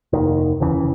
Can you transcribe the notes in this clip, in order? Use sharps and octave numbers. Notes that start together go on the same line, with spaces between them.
F1 D#2 D#3
F1 D#2 C#3 E3